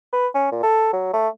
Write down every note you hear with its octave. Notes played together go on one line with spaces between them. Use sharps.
B4
C#4
A#2
A4
F#3
A3